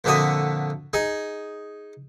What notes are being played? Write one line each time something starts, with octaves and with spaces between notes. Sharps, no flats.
F2 A#2 D3 F#4 E5 D#6
D#4 G#4